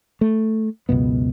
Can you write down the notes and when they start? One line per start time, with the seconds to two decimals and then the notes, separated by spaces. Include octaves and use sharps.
0.21 A3
0.89 C#2 F#2 B2 B3